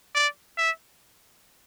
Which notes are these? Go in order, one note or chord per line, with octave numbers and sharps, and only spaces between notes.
D5
E5